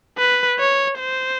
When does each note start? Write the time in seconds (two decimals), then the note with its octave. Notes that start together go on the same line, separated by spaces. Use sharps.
0.18 B4
0.59 C#5
0.99 C5